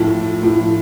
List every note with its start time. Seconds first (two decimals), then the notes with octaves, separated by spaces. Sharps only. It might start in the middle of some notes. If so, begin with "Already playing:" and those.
Already playing: A2 F3 A4
0.43 A2 F3